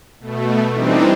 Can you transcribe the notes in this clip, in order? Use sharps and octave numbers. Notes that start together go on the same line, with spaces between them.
B2 A3
E3 G3 C4 D4 D#4